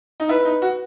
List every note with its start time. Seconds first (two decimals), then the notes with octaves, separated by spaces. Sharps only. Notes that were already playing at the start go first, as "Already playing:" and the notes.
0.20 D#4
0.29 E4 B4
0.45 D#4
0.62 F#4